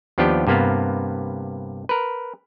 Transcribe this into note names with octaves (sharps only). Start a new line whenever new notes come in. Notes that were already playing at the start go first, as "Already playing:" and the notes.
D#2 F3 B3 D4 G4 G5
G2 C3 A#3 B3 F5
A#4 B4